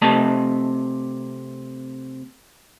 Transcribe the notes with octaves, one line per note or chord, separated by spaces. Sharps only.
C3 A3 D#5 A5